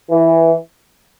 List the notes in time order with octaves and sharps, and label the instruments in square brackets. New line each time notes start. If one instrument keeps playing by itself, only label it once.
[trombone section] E3